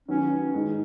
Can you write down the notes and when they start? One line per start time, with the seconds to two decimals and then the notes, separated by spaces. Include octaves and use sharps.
0.08 D#3 F#3 B3 C#4
0.53 G#2 D#3 G#3 D#4